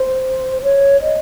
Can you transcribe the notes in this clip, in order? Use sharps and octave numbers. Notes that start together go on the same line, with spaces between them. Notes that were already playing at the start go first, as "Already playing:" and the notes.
Already playing: C5
C#5
D#5